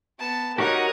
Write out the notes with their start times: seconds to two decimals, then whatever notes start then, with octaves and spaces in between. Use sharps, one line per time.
0.19 B3 A5
0.58 D#4 F#4 G4 A#4 C#5 F#5 A#5 D#6